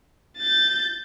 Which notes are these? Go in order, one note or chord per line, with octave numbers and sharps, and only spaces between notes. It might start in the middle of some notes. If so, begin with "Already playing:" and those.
G6 A6